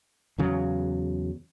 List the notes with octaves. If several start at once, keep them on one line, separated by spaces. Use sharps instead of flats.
E2 C#3 F#3